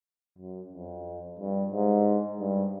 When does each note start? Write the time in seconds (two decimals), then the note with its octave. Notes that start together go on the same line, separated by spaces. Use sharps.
0.39 F#2
0.73 F2
1.39 G2
1.72 G#2
2.40 G2